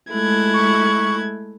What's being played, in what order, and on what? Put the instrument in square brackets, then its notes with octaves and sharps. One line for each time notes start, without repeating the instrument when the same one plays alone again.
[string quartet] G#3 E4 F#6 [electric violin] A3 G#6
[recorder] C#6